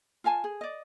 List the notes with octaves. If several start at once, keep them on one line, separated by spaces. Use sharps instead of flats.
F4 F5 G#5 A5
G#4
D5 D#5